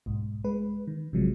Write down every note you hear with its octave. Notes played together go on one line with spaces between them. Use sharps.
B1 G#2
G#3 B4
D#3
A1 C3 F3 F#3 G#3